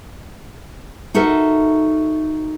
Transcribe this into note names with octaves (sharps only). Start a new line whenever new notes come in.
D#4 F#4 A4 A#4 E5